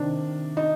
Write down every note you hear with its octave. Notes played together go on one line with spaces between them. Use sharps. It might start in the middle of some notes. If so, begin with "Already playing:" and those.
Already playing: C3 D#3 D4
D#4